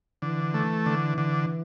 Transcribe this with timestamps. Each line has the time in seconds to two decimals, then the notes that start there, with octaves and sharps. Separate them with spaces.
0.22 D3 E3
0.54 A3
0.86 D3
1.18 D3